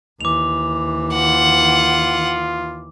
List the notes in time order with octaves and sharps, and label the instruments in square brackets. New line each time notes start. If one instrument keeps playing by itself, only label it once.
[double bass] D#2 E3 [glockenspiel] D6 F7
[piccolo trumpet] F4 [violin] F#5